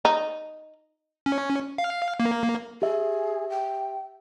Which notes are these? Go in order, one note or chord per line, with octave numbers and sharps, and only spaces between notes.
D#4
C#4
F5
A#3
G4 G#4 E5
G5